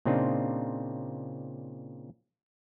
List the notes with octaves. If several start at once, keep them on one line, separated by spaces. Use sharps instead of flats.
A#2 C#3 C4 D4 D#4 F4